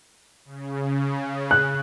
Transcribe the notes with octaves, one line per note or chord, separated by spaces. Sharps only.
C#3
F#6